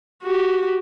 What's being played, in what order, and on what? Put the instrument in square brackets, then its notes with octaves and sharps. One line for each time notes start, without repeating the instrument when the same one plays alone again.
[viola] F#4 G4